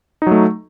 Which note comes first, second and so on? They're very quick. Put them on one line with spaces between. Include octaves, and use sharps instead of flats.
D#4 F#3 A3